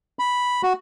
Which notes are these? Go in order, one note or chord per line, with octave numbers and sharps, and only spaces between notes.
B5
F#4